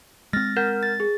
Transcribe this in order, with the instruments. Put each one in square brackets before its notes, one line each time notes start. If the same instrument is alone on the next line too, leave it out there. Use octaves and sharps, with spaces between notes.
[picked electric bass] G#3 C4 [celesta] F6 [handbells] A6 A#6
[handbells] A#4 [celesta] F#5 F6 G6
[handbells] A6
[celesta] G#4